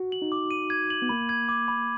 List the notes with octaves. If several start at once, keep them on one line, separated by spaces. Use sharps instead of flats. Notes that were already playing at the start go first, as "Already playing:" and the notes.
Already playing: F#4
F#7
D#4
D6
D#7
G#6
F#7
B3
A#3 B5
G#6
D6
B5